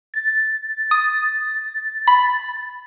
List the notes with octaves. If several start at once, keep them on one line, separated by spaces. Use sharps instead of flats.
A6
D#6
B5